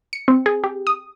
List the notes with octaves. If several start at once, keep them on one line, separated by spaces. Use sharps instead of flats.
C#7
C4
G#4
G4
D#6